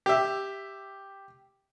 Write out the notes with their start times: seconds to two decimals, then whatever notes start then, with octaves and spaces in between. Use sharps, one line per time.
0.06 G4 E5